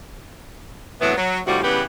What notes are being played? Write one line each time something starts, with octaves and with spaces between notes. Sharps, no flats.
A2 C3 E3 F#3 B3 E4
F#3
D2 A2 C3 F3 G3 F#4
C#3 E3 G3 B3 G4